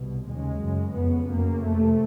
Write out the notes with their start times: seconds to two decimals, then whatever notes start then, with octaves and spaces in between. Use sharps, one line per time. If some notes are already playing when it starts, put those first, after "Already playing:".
Already playing: C2 B2
0.26 D#2 C#3 G#3
0.60 F#2 C#3
0.95 F2 C#3 B3
1.29 F#2 C#3 A#3
1.63 F2 C3 A3